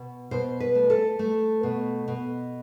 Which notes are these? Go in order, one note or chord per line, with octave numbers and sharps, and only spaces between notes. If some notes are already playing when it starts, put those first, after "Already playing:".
Already playing: B2
B2 C5
B4
A3
A4
A3
B2
B2